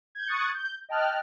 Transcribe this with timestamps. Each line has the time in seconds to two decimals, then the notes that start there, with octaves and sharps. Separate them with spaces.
0.15 G6 G#6
0.28 C#6 D#6 F#6 G#6 A6 C#7
0.54 G6
0.89 D#5 G5 A5 F6 F#6